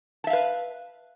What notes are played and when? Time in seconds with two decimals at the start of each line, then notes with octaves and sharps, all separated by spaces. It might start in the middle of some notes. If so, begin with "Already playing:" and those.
0.24 A5
0.27 E5
0.30 F5
0.33 B4